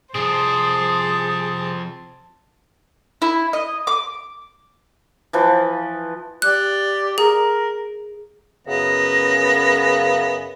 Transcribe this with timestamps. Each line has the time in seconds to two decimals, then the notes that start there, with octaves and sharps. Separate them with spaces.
0.15 C2 F3 C4 G#4 C5 A5
3.22 E4
3.53 D#5
3.87 D6
5.33 E3 F3 B4
6.42 G4 D5 F#6
7.18 G#4 A#4
8.67 F#2 C#3 B3 A#6